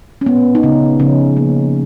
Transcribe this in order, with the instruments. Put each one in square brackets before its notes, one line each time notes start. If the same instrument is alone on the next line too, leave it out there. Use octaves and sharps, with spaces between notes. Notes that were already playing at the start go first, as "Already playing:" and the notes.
[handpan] C#4
A#2 B3
D#4
C#3 C#4
C#3 F3 C#4
F3 A#3